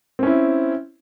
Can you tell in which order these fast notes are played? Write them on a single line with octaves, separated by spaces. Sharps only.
C4 C#4 E4